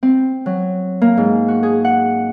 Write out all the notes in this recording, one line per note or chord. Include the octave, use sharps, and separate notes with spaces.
C4
F#3
A#3
G#2
F#4
G#4
F#5